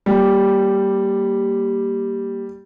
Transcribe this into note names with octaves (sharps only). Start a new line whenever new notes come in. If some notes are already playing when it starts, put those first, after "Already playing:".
G3 A#3 G4 D6